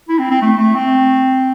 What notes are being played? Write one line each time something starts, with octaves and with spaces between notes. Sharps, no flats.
E4
C4
C4
A3
A3
C4